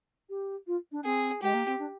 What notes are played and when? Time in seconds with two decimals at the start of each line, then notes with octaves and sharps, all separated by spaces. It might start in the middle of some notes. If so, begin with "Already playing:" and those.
0.30 G4
0.67 F4
0.92 D4
1.05 C4 G#4
1.42 G#3 G4
1.54 A#3
1.66 C4
1.79 D4